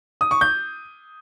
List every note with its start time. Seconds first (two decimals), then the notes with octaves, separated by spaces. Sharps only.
0.21 D#6
0.31 C#6
0.41 G6